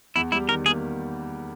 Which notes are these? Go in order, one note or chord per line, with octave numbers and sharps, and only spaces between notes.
E2 E4
G3 E4
D#3 A#4
A#3 G#4